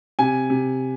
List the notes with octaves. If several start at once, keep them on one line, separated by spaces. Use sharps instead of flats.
C3 G#5
C3